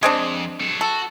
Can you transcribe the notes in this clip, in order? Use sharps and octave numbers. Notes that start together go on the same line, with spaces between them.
F2 G#3 C4 D4
F#3 A4
F#4 A4